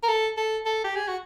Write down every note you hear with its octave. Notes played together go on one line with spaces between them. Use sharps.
A#4
A4
A4
A4
G4
G#4
F#4